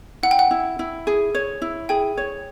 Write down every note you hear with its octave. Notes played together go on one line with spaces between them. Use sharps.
E4 F#5
G5
F#5
E4
E4
G#4
C#5
E4
G#4 G5
C#5